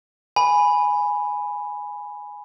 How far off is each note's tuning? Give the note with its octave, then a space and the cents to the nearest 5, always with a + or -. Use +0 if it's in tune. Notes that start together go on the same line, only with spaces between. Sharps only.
G#5 +0 B5 +0